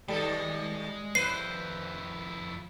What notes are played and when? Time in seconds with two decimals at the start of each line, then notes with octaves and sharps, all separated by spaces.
0.08 D#2 G3 G#3 A4 D#5
1.15 F2 E4 B4 C5 C7